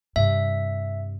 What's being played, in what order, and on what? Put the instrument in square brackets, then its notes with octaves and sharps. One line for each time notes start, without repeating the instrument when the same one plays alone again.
[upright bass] G2 C3 [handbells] E5